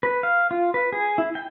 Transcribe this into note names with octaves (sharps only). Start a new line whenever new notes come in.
B4
F5
F4
B4
G#4
E4
G5